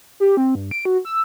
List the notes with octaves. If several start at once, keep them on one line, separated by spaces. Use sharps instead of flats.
G4
C4
G2
D7
F#4
E6